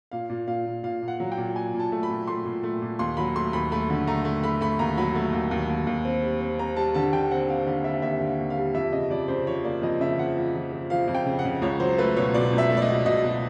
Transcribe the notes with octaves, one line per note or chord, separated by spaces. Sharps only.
A#2 F5
A#2
A#2 F5
A#2
A#2 F5
A#2
F#5
F#3
G5
A#2
A#2 G#5
A#2
A5
A3
B5
A#2
A3 C6
A#2
A3
A#2
D#2 C6
F#3 B5
A3 C6
D#2 B5
A3 B5
D3
A3 A#5
A3
A3 B5
A3 B5
D#2 A#5
F#3 B5
A3
D#2
D#2
D#2
D#2
C4
G3
C4
C4 A#5
G3 A5
D3 A5
D3 G5
C4 F#5
C4 F5
D3 F5
G3 E5
D#2 E5
D3
F5
D#2
F5
G3
F2 E5
C#3 D#5
F2 D5
C#3 C5
F3 C#5
A#3 D5
F2 D#5
C#3 E5
F3 F#5
F3
F3
F3
F3 F5
F2
G5
C#3
F#5
C#3
C#2 C#5
F#3 C5
A3 B4
B2 C#5
B2 D5
C#2
E5
A3
D5
D#5
B2
B2 D#5
B2